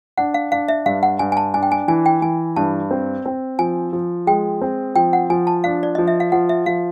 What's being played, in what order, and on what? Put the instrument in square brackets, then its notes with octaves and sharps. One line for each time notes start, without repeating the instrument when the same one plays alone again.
[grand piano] D4 [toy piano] F#5
[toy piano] F5
[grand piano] D4 [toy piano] F5
[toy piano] E5
[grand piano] G2 [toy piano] F5
[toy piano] F#5
[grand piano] G2 [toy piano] G#5
[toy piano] G#5
A5
[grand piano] D4 [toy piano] G#5
[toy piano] G5
G#5
[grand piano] E3 [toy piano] G#5
[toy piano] G5
[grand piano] E3 [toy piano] G#5
[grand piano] G2 [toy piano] A5
[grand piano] C4
C4
[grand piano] F3 [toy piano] G#5
[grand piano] F3
[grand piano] G#3 [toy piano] G5
[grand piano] C4
[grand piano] F3 [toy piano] G5
[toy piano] F#5
[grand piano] F3 [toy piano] G#5
[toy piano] A5
[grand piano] D4 [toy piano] F5
[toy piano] D5
[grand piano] F3 [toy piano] D#5
[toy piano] E5
F5
[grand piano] F3 [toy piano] F#5
[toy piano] E5
[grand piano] F3 [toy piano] F5